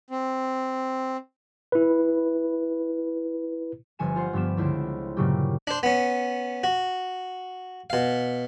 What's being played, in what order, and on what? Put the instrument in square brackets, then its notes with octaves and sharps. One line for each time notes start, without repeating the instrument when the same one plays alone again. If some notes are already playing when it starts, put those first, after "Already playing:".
[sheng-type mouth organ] C4
[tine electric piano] E4 B4
[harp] G1 F3 B4 G#5 C#7 E7
F4 C5 F#5
G2 F3 B3 G4 E7
C#2 D3 E4 C5 D7
G2 A#2 C#3 F#3 A#3 G4
[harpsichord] D4 C5
B3 C#4
F#4
B2 F5